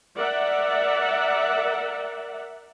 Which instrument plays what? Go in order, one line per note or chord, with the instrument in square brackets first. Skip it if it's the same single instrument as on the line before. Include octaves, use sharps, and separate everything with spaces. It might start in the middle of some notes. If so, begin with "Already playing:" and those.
[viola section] A#4 D5 E5 F#5